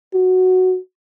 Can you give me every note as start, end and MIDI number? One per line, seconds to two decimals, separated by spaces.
0.14 0.78 66